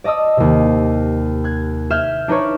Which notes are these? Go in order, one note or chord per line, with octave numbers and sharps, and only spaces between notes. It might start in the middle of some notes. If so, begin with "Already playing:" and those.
D5 D#5 A5 D#6 E6
D#2 C3
F#6 G#6
E5 F6 G6 G#6 E7
D4 D#4 B4 C#5